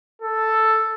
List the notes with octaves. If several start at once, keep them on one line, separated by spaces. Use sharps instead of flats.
A4